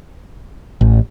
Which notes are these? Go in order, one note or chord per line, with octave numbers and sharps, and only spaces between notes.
A1